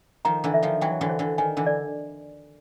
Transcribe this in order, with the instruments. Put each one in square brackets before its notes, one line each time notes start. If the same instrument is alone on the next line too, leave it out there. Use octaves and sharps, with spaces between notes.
[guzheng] D#3 F3 [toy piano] A#5
[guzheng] D3 E3
[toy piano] E5
[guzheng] D#3 F3
[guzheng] E3 F#3 [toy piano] G5
[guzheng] D3 E3
[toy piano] C5
[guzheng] D3 E3
[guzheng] D#3 [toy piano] G#5
[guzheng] D3 E3
[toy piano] D5